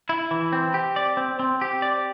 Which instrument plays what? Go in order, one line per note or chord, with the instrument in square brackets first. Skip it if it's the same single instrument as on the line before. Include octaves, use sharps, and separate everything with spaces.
[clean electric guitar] E4
E3
C4
G4
D5
C4
C4
G4
D5